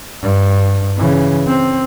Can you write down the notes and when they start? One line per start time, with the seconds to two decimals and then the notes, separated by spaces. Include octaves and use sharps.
0.22 G2
0.97 C#3 E3
1.47 C4